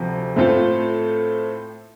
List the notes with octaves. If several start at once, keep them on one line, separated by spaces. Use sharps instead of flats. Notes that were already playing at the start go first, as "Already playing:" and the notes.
Already playing: D2 C3 F3
A2 A3 C4 F4 A4